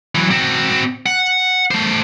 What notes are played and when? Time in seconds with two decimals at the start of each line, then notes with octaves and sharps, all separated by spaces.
0.15 E3 F#3
0.31 C4 F#4
1.06 F#5
1.71 A3 C5